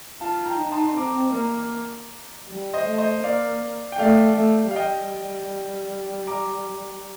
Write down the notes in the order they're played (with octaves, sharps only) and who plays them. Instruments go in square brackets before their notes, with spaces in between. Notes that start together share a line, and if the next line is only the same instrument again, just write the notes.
[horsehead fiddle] F4 [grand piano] F5 A5
[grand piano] G5 A#5
[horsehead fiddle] D#4
[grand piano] A5 C6
C6
[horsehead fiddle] C4 [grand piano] A#5 D6
[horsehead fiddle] A#3
G3
[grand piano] C5 D#5
[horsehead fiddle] A3
[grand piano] C5 D#5
[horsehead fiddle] A#3 [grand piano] D5 F5
[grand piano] G5
[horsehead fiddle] A3 [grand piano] D5 F5
[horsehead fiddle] A3
[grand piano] F5
[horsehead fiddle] G3 [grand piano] D#5 G5
[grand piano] A#5 D6